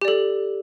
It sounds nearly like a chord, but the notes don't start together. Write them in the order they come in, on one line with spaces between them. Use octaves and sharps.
G4 D5 A4